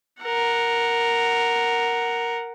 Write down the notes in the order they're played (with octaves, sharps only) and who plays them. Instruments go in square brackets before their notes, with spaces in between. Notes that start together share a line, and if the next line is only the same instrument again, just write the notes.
[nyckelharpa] A#4 F#5